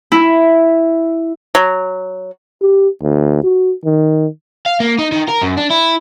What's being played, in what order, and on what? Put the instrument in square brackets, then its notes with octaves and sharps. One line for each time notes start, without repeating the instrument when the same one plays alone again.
[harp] E4
[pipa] F#3
[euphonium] G4
D2
F#4
D#3
[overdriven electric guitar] F5
A#3
D#4
D#3
A#4
F#2
D4
E4